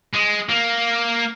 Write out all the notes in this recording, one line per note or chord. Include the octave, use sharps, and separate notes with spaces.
G#3
A#3